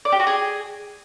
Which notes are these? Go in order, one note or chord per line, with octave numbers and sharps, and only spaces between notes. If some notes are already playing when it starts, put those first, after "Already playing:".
D5
G4
F#4
G#4